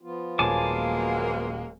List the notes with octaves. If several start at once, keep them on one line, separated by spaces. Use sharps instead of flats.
F3 B3 F4
D#1 F#3 G#3 A#3 C#5 G#5 A5 D6